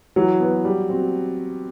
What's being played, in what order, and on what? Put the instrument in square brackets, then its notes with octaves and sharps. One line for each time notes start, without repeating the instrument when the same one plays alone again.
[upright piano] E3 [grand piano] F#3
[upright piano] B3 F#4 B4
G3
C4 F#4